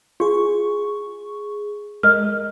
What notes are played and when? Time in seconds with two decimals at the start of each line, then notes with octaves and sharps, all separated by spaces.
0.20 F4 G#4 C#6
2.03 G#3 A#4 D#5 F6